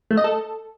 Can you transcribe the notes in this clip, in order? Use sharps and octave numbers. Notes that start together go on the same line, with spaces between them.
A3
D#5
A4